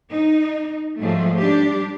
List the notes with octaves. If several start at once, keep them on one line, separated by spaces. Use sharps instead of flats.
D#4
G#2 F3 F#3 G#3 A3
G3 D4 G4